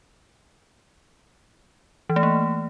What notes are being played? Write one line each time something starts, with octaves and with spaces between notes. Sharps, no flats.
E3
A3
A#3